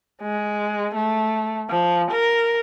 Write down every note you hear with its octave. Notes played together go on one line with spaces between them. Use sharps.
G#3
A3
F3
A#4